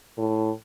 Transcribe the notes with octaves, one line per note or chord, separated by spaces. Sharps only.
A2